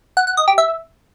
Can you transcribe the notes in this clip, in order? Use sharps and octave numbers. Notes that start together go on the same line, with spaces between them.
F#5
F#5
D#5
G4
E5